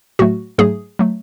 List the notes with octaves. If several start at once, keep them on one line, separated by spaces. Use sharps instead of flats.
A2 F#3 A3 F#4
G#2 F#3 A3 G#4
F#3 A3